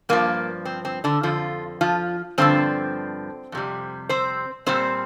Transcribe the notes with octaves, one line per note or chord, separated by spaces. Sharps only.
G2 F3 A#3
C4
C4
D3 D4
F2 D3 F3 F4
F3 F4
G2 D3 F3 C4
F2 C3 G3
C4 C5
A#2 G3 C4 C5